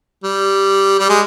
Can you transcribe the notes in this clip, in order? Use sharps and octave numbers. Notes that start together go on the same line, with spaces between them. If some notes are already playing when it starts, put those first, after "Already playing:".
G3
G3
G#3